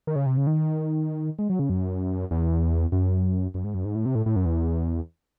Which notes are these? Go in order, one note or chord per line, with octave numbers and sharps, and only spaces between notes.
D#3
C#3
C3
C#3
D#3
G#3
F#3
C#3
F#2
E2
F#2
F#2
G#2
F#2
G#2
A2
C3
A2
A2
F#2
E2